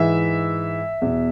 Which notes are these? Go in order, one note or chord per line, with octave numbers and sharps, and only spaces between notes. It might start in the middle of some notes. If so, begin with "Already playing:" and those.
Already playing: G#2 E3 E5
E2 B2